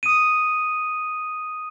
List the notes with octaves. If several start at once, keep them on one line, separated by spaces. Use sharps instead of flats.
D#6 D#7